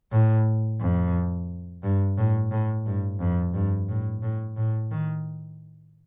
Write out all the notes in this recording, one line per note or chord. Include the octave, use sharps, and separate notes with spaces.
A2
F2
G2
A2
A2
G2
F2
G2
A2
A2
A2
D#3